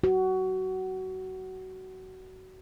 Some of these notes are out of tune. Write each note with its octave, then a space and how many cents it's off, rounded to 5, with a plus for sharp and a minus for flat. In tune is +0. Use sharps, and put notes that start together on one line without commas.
F#4 +20